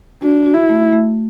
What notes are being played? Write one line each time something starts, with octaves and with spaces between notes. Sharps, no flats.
D4 F#4
F#4
E4
A3
A3